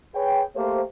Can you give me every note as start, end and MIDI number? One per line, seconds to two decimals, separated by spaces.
0.15 0.42 68
0.15 0.42 71
0.15 0.42 73
0.15 0.42 79
0.56 0.81 57
0.56 0.81 58
0.56 0.81 67
0.56 0.81 72